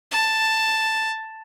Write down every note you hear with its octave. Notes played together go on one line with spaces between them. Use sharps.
A5